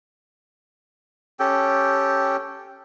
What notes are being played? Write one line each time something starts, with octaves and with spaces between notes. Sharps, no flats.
C#4 G4 A4 G5